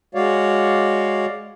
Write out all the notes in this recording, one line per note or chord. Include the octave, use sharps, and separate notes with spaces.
G#3 F#4 C#5 D5 F5